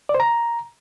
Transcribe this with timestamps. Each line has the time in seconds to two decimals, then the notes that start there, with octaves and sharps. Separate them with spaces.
0.09 D5
0.15 C5
0.20 A#5